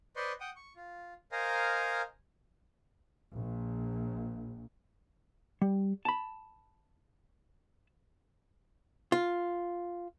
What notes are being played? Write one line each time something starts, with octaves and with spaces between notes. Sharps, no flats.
B4 C5 D5 D#5 C6 C#6
F#5 G5 D#6
C#6
F4
A#4 C5 D#5 F5 G#5 A#5
A#1
G3
A5 B5
F4